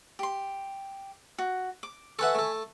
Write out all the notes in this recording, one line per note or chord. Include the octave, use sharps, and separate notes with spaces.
G4 C6
F#4
D6
A4 B4 E5 F#5 G#5 C#6
A3 A4